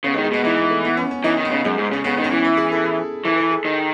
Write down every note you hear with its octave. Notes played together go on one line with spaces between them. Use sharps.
C#3 B3
G#3
D#3
G#3
B2 B3
E3 D#4
B3
A3
B3
C#4
C#4
E3 D#4
D#3
B3
C#3
F#2 G#3
G#2
C#3 C#4
C#3 B3
D#3
C#4
E3
E4
G#4
A4
G#4
E3 A4
A4
G#4
D#3